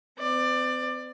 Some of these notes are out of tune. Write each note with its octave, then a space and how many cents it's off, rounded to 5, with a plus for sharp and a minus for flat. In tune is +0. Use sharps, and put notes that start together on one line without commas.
C4 -40 D5 +20